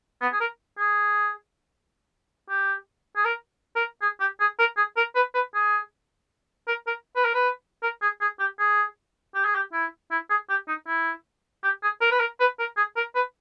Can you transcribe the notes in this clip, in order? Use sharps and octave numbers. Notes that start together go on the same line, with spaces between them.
B3
G#4
A#4
G#4
G4
G#4
A#4
A#4
G#4
G4
G#4
A#4
G#4
A#4
B4
B4
G#4
A#4
A#4
B4
A#4
B4
A#4
G#4
G#4
G4
G#4
G4
G#4
G4
E4
E4
G#4
G4
D#4
E4
G4
G#4
A#4
B4
A#4
B4
A#4
G#4
A#4
B4